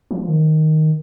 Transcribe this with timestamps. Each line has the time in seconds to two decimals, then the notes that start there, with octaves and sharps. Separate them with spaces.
0.11 F3
0.28 D#3